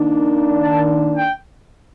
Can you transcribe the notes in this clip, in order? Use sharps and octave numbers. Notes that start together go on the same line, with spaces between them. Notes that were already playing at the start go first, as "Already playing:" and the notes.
Already playing: D#3 A#3 D4
A5
G5